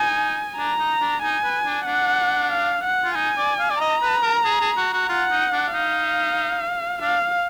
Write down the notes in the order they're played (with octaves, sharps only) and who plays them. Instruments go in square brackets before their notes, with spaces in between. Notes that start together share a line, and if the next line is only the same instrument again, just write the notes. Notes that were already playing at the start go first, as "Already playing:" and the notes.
Already playing: [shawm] D#4 [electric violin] G#5
[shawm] D4 [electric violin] A#5
[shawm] D#4
D4
[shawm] D#4 [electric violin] G#5
[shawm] B4
D4
[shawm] D4 [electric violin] F#5
[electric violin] F5
F#5
[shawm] F4
[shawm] D#4 [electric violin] G#5
[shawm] D5
F5
D5
[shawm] D#5 [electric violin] A#5
[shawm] B4
A#4
G#4
G#4
F#4
F#4
[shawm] F4 [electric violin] F#5
[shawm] D#4
D4
[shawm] D#4 [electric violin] F5
[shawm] D4 [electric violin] F5